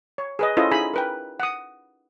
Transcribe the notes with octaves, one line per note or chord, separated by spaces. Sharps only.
C#5
G#4 B4 D#5
C#4 E4 F4 A4 C5 D#5
D#4 E4 G#4 G#5 B5
A#4 B4 G5
F#5 D#6